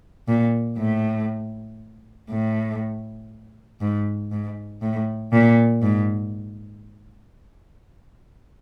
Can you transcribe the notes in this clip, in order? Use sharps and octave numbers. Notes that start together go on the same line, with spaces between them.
A#2
A2
A2
G#2
G#2
A2
A#2
G#2